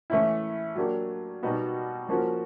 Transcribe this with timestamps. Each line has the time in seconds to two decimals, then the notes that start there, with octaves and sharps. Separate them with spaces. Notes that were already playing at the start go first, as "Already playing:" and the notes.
0.10 E3 A3 C#4 E4
0.75 F#3 A#3 D4 G4
1.43 B2 G3 B3 D#4 F#4
2.08 F3 A#3 C#4 F#4